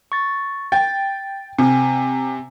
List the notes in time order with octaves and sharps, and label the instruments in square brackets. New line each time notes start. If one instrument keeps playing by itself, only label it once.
[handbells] C#6 A6
[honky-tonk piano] G5 [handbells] A6
[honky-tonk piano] C3 [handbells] C4 G#5